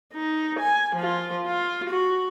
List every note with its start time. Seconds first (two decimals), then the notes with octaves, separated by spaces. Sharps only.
0.13 D#4
0.59 G#5
0.96 F3 F4
1.47 F4
1.90 F#4